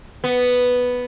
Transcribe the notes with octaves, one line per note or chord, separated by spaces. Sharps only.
B3